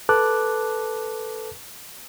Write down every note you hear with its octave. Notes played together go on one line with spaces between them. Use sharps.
A4 B4 A5 D6 F#6